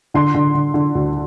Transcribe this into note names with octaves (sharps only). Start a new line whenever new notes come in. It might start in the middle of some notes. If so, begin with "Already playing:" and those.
D3 C6
D3
D3
D3
D2